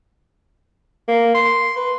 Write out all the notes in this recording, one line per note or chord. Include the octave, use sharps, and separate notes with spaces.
A#3
C6
B4